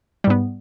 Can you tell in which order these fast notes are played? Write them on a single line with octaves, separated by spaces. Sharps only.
G3 G#2 B3